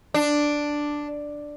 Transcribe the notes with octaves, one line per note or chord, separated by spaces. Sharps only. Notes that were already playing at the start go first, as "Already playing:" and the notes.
D4